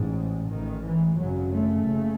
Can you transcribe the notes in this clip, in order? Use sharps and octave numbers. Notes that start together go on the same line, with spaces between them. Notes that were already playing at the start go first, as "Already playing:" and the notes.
Already playing: A1 G#2
A1 G#2 D#3
E3
G#1 F#2 C#3 F#3
A3
F#1 F#2 C#3